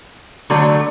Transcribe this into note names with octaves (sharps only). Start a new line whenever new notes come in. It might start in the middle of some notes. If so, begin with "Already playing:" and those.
D3 F#3 A3